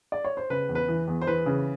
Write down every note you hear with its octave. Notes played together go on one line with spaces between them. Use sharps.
D5
C#5
C5
C#3 B4
E2
B4
E3
E2
C5
E3 B4
C#3